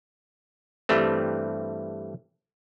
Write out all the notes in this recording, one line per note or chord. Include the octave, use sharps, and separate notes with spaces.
G2 E3 G3 A3 C4